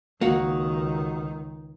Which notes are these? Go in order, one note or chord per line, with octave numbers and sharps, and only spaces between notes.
C#2 D#3 A#3 F#4